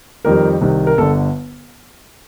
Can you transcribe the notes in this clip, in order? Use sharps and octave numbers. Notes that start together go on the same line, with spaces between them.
F2 D#3 G3 A#4
C2 C3 D#3
A#4
G1 D3 A4